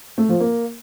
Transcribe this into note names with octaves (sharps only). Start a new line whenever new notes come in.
A3
F3
A#3